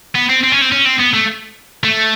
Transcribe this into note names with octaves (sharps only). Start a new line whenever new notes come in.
B3
C4
C4
C#4
C4
C#4
C4
B3
A3
A3